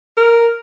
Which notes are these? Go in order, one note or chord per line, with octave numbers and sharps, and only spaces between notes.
A#4